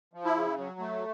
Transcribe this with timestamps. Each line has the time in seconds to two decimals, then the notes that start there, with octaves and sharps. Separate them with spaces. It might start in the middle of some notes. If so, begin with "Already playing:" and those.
0.13 F3
0.25 E4
0.36 C#3
0.58 F#3
0.79 A3